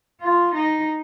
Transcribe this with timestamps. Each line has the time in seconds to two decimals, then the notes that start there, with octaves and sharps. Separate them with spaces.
0.22 F4
0.54 D#4